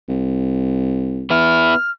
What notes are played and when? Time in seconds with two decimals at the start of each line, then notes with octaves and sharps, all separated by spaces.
0.08 C2
1.30 B3 E4 F6